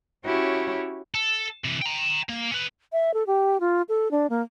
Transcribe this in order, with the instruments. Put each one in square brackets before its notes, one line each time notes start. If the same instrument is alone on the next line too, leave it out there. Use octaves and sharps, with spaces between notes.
[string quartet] C#4 E4 F#4 G4 C#5
[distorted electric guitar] A4
C3 E3
G5 A#5
A#3
C#4 B4
[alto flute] E5
A4
G4
F4
A4
D4
A#3